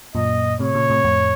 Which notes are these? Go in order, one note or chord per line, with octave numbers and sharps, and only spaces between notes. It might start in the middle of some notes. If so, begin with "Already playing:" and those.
F#2 A#2 D#5
A2 C3 C#5
A#2 C#3
A2 C3
F2 A2